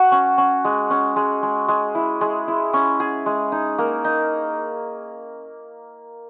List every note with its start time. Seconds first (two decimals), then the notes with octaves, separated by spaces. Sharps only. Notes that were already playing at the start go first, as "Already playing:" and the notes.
Already playing: F#4
0.12 C#4
0.38 C#4
0.65 G#3
0.90 C#4
1.16 G#3
1.43 G#3
1.68 G#3
1.95 E4
2.21 G#3
2.48 E4
2.73 C#4
3.00 G#4
3.26 G#3
3.52 D#4
3.78 A#3
4.05 D#4